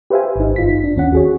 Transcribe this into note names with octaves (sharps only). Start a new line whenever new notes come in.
G4 B4 C5 E5 F5 G#5
G#1 D#4
G1 F4 B6
D4
D#2 C#4 F#5
F#4 G#4 C#5